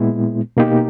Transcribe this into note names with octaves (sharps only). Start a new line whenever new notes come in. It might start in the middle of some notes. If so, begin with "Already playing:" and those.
Already playing: A#2 G#3 B3 E4
B2 A#3 D#4 G4